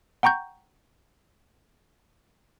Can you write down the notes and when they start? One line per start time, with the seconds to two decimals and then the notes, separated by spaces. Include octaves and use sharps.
0.23 F#5 G5 A#5 C#6 G6